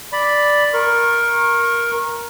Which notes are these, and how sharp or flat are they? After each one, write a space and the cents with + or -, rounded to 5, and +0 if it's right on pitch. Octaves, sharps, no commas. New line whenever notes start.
D5 +0 B5 +0
A#4 +10 C#6 -30